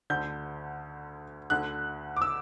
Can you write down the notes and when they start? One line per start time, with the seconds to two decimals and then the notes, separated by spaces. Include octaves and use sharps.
0.10 D2 D3 G6
1.50 D2 D3 F#6
2.17 D6
2.22 E6